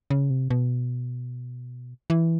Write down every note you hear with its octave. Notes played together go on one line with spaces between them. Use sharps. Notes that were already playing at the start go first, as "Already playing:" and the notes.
C#3
C3
B2
E3